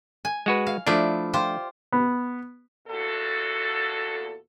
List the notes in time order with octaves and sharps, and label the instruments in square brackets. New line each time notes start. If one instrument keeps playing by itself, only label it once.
[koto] G#5
[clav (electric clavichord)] G#3 F#4 B4
[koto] F5
[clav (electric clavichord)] F3 A3 D4 [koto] E4 D5
[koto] F4 G4 C5
[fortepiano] B3
[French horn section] E2 A#2 F#4 A4